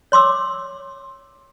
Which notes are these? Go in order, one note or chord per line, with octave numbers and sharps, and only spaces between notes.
C#5 C6 D6 E6